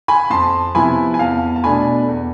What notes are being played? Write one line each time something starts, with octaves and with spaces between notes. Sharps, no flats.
G#5 B5
F2 A5 C6
C3 F3 B3 E4 G#5 B5
G#5
E2 F5 A5
A5
B2 A3 D4 G#5 B5
E2